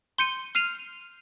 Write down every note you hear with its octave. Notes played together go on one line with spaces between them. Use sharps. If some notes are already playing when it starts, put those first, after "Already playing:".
C6 G6 C#7 D#7
F6 C7 D#7 F7